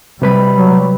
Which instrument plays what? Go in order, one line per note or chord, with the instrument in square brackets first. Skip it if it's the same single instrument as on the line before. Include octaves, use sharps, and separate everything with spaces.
[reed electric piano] C3 B4 B5 [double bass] G3
[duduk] F#3